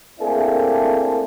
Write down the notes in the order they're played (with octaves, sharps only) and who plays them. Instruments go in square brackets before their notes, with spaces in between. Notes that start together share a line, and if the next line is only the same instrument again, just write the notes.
[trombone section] A3 A#3 C4 D4 E4 G#4